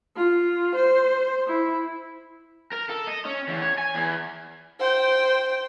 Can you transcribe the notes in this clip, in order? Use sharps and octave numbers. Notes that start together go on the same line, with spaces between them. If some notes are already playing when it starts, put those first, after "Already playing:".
F4
C5
E4
A#4
A4
D#5
C#4
E2
C#5
G#5
E2
C5 G5